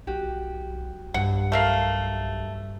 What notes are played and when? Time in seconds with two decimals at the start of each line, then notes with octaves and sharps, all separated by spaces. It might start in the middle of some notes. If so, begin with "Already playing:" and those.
0.07 B1 F#4 G4
1.14 B1 G2 F#5
1.52 A3 A#4 F5